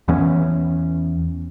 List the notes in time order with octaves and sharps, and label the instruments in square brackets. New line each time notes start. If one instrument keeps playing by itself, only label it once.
[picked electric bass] E2 E3 B3 C#4